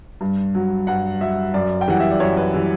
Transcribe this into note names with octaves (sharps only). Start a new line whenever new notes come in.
G2
F#3
G2 F#5
F#3 E5
F#2 D5
G5
E3 G3 F#5
E5
D5
F#2 C#5
B4
E3 G3